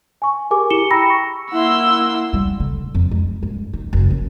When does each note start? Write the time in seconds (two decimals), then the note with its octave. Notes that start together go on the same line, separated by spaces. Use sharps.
0.22 G#5 C#6
0.51 G4 G#4 A#4 G#5 D6
0.70 E4 G4 G#4 C#7 E7 G7
0.90 G5 A#5 B5 E6 A#6 C#7
1.10 C#6
1.52 A#3 E4 F#5 C6 E6
2.34 G3
2.60 D3
2.78 D#2
2.95 F2
3.11 G#3
3.43 G2
3.73 D#3
3.93 F#1
4.10 C#4